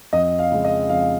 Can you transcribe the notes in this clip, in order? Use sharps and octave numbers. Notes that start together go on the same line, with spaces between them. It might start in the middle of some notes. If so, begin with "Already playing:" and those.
F2 D#5
F5
C#3 G#3
D#5
F2 F5